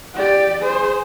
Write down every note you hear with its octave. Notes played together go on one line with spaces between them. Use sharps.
G4 D5
G#4 C5